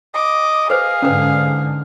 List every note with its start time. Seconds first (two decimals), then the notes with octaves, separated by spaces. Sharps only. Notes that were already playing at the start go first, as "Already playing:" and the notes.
0.15 D#5 D6
0.70 G#4 B4 C5 F5
1.02 G#2 D3 C#4 B4